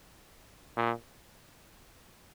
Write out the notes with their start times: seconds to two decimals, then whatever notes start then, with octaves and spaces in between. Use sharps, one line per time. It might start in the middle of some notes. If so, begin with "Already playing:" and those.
0.77 A#2